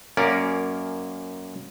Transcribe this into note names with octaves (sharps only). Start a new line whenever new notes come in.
F#2 A#3 C#4 A#4 D5